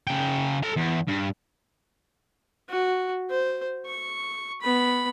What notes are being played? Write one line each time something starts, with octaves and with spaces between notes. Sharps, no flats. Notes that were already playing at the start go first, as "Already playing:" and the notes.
C#3 G5
A4 A#5
E2
G2
F#4
C5
C#6
B3 B5